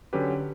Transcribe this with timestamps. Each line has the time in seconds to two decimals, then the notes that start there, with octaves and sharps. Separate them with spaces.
0.13 D3 F#3 C#4 G4 B4